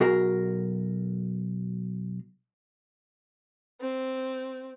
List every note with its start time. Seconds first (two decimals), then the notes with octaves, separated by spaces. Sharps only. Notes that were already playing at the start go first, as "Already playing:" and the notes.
0.01 B1 F#4 G#4 A#4
3.81 C4